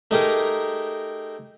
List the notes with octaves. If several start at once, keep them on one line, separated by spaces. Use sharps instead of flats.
A3 D#4 G4 G#4 A#4